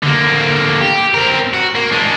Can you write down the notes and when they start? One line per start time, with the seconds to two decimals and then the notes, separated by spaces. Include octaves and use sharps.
0.03 D3 A#3
0.81 G4
1.14 C4 A#4
1.54 F#4
1.75 A#3
1.91 G#3 D4